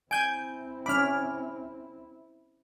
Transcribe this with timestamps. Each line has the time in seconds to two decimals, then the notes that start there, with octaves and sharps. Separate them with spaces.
0.11 C4 E4 G#5 G6 D7
0.86 C#4 B5 D6 F6